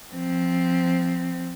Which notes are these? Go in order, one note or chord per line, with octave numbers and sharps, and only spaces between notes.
F3 C4